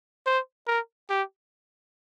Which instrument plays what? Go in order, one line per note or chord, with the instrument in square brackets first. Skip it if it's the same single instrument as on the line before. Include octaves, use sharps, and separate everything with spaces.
[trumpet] C5
A#4
G4